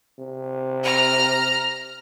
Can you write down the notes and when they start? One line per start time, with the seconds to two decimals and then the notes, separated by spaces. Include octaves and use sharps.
0.19 C3
0.83 A#5 F6